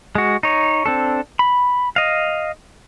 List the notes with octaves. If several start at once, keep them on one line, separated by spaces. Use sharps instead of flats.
G#3 F#4
D#4 C#5
C4 D4 A4
B5
D#5 F5